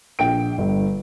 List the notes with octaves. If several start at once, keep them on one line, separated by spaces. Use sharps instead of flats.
A#1 G5 D7
G1